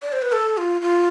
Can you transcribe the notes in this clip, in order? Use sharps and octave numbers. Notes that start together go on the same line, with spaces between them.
D5
C5
B4
A4
F4
F4